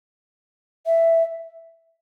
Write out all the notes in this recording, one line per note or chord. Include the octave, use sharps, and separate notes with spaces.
E5